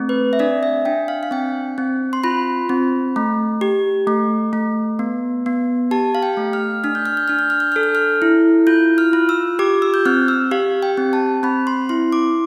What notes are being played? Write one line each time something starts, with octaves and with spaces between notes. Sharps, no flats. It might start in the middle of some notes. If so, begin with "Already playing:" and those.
Already playing: A3 C4
B4
E5
D4 D5
E5
D4 G5
F5
F5
C4 G5
C4
C6
F4 B5
C4
A3
G4
A3
A3
B3
B3
G4 A5
F5
G5
A3
F6
D4 F6
G6
F6
G6
D4 F6
G6
F6
G6
A4 F6
G6
F6
E4
F4 G6
F6
F4
E6
G4 D6
E6
G6
C4 F6
E6
G4 F5
G5
C4
A5
C4 B5
C6
E4 C6
D6